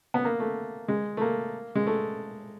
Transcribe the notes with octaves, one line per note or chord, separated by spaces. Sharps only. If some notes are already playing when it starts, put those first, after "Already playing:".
B3
A#3
A3
G#3
A3
A#3
G#3
A3